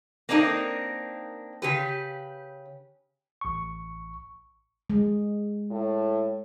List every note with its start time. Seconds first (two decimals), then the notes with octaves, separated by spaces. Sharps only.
0.29 A#3 C4 D4 D#4 A#4
1.62 C#3 G4 B4
3.41 A1 C#6
4.90 G#3
5.71 A2